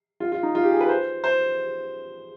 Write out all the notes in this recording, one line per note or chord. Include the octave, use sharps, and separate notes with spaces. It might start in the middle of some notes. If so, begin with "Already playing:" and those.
F4
F4
D#4
F4
G4
G#4
B4
C5
C5